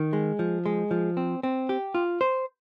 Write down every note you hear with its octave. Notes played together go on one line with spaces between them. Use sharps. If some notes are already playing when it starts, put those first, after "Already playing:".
Already playing: D#3
G#3
F3
G#3
F3
C4
C4
G4
F4
C5